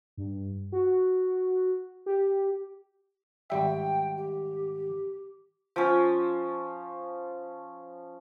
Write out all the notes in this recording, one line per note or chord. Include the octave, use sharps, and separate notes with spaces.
G2
F#4
G4
G#1 G3 E5 G5
G4
F3 C#4